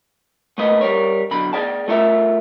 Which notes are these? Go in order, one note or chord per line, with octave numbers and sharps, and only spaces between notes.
A3 A#3 B4 D#5
G3 A#4 C#5
B1 D3 F#3 B5
G#4 D5 G5 A5
A3 F4 A4 A#4 D5 E5